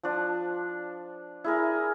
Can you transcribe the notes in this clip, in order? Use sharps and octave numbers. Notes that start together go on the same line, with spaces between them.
F3 D4
E4 G#4 A#4